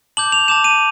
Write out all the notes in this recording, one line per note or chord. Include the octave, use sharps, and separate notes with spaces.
A5 D6 G6 F#7
F7
A5 D6 G6 E7
D#7